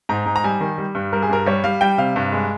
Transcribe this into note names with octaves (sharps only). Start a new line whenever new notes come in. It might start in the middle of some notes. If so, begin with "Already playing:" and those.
G#2 A#5
G#2
A#5
G3 G#5
D#3
G3
G2
G3 A#4
G#4
G2 A#4
G3 C#5
G3 F5
G3 G5
C3 F5
G2
G#3